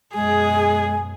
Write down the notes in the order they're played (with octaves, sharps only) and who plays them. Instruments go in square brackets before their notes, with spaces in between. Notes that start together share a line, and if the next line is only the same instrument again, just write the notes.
[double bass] F#2 B2 [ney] G#3 [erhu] G#4 [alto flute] G#5